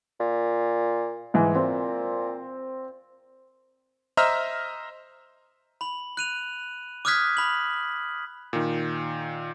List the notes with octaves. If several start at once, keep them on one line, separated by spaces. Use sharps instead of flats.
A#2
G#2 E3 G#5
A#2 C4
C5 D#5 E5 A#5 E6 F6
B5 F#7
F#6 D#7 F7
D6 D#6 F6 F#6 G#6 B6
B5 F#7
A#2 D#3